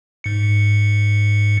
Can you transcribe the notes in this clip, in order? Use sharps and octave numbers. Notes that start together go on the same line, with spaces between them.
G#2 C#7